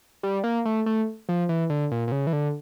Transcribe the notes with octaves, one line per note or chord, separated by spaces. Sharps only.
G3
A#3
A3
A3
F3
E3
D3
A#2
A#2
C#3
E3
D3